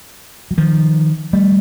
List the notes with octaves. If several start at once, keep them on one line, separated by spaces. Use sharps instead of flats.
F#3
D#3 F3
G3 A3